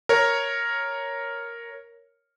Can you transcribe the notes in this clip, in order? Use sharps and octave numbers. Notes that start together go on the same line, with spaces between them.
A#4 C#5